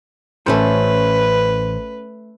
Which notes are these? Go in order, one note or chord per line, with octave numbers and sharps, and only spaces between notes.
A1 A3 C#4 A4 B4 C5